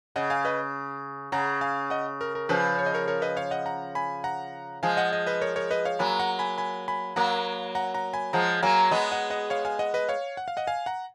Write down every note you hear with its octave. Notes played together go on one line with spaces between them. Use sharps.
C#3 D#5 F#5
F5 G#5
B4 D#5
C#3 F#5 A#5
F5 G#5
D#5 F#5
A#4
A#4
C#3 F3 B4
C#5
D#5
A#4 C#5
A#4 C#5
B4 D#5
C#5 F5
D#5 F#5
F#5 A#5
G#5 B5
F#5 A#5
F3 G#3 F5 G#5
D#5 F#5
D#5 F#5
B4 D#5
A#4 C#5
A#4 C#5
B4 D#5
C#5 F5
F#3 A#3 G#5 B5
F#5 A#5
G#5 B5
G#5 B5
G#5 B5
F#3 A#3 F#5 A#5
F#5 A#5
F#5 A#5
G#5 B5
F3 G#3 F#5 A#5
F#3 A#3 F5 G#5
G#3 B3 D#5 F#5
D#5 F#5
D#5 F#5
C#5 F5
F5 G#5
D#5 F#5
B4 D#5
C#5 F5
F#5
F5
D#5 F#5
F5 G#5
F#5 A#5